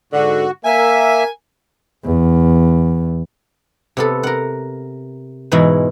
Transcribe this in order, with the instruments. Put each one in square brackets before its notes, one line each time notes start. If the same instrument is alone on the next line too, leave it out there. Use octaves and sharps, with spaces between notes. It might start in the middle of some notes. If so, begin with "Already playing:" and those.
[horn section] G#2 D3 [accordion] F#4
[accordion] A#3 E5 [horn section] A#4 G#5
[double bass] E2
[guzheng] C3 B3 A4
A#4 F#5
E2 G#2 B2 E3 G#3 E4